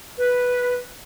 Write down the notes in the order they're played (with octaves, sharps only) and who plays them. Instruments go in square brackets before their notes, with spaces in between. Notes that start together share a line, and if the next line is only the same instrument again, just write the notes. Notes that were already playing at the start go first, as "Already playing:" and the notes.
[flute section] B4